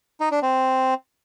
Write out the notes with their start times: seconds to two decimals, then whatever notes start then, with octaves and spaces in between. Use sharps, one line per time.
0.20 D#4
0.31 D4
0.43 C4